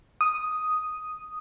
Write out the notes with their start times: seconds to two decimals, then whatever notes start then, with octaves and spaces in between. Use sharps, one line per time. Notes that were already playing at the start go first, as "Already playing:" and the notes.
0.21 D#6